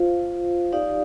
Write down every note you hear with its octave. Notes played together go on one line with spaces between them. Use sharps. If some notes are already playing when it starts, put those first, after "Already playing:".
Already playing: F4 C5 F5
D#4 G4 D5 F5